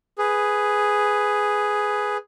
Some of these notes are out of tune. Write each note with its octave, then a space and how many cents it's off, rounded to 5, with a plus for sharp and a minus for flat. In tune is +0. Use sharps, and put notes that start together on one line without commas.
G#4 +0 B4 +5